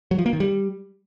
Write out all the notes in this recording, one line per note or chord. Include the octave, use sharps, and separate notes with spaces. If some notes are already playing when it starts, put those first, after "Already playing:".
F#3
F3
A#3
D#3
G3